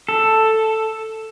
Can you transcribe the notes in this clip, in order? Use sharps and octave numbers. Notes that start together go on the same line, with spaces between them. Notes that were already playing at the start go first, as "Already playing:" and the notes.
A4